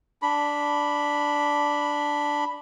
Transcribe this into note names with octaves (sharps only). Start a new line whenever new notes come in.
D4 B5